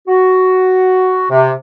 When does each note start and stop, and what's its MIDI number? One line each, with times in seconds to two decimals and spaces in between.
0.08 1.25 66
1.30 1.52 48